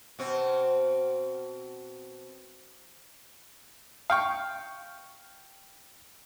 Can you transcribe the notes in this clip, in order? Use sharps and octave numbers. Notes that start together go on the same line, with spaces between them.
B2 C4
F5 G5 C#6